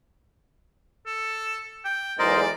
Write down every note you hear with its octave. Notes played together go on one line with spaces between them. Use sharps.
A4
G5
B1 E2 G#3 A#4 C5 D5 D#5